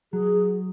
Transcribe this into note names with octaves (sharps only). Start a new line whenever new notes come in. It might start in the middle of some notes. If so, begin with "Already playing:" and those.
F#3 G#4